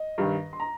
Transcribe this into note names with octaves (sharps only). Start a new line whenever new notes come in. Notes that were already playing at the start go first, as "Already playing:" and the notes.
Already playing: D#5
G2 D#3
C6
A#5